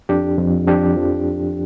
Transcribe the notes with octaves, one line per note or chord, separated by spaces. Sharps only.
F2 D4 G4
F2
F2 D4 G4
F3